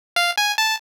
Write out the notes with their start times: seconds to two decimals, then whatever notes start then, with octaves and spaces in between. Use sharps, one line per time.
0.16 F5
0.38 G#5
0.58 A5